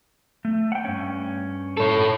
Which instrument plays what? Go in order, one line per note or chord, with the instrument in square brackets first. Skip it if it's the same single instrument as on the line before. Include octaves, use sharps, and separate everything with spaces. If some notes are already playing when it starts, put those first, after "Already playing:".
[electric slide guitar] A3
F#5 G5
G2 C#4
[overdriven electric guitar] A4 C#5